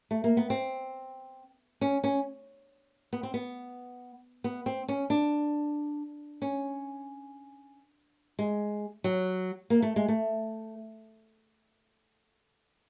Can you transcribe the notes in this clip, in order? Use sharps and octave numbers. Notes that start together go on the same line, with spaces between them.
A3
A#3
B3
C4
C#4
C#4
B3
C4
B3
B3
C4
C#4
D4
C#4
G#3
F#3
A#3
A3
G#3
A3